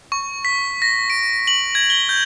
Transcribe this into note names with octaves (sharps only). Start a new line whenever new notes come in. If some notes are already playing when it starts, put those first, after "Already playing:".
C#6
B6
A#6
D7
F#7
G#6
G7
G6